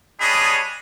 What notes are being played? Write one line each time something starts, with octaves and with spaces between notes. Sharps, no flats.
G3 D4 G#4 C#5 D#5 B5